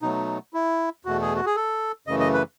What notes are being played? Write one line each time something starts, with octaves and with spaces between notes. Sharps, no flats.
B2 F#3 A3 D#4
E4
E2 B2 A3 F#4
G#4
F#4
G#4
A4
F#2 C#3 E3 A3 D#5
D#5
B4